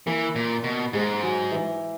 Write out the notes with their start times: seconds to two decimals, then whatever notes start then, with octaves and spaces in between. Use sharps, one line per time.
0.06 E3 A#3
0.36 A#2
0.64 B2
0.93 G#2 G#3
1.23 F#3
1.52 E3